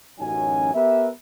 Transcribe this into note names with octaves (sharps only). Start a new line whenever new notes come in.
A1 F#2 F#3 C#4 D#4 G#5
B3 G4 A#4 B4 E5